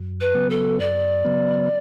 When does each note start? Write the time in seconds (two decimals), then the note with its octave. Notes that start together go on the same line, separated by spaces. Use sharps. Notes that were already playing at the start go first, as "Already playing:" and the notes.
Already playing: F#2
0.20 B4
0.34 C#3 F#3 B3
0.49 A4
0.79 F#2 D5
1.24 C#3 F#3 B3